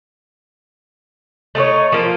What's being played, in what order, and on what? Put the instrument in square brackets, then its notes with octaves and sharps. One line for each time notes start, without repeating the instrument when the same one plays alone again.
[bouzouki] A3 D#4 F4 C#5
F3 A#3 F4